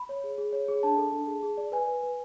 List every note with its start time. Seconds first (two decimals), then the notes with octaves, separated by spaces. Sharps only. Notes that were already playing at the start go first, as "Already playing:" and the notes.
Already playing: B5
0.09 C#5
0.24 G#4
0.38 G#4
0.53 C#5
0.68 G#4
0.83 D4 A5
0.98 A4
1.12 D4
1.27 G#4
1.43 G#4
1.57 D5
1.72 B4 G#5
1.88 B4
2.03 B4